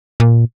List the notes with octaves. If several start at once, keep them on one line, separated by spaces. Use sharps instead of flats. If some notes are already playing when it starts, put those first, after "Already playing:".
A#2